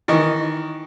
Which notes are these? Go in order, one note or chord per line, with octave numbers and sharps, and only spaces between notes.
D#3 E3 D#5 C#6